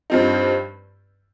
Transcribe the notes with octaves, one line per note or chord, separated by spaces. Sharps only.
G2 F3 C4 D#4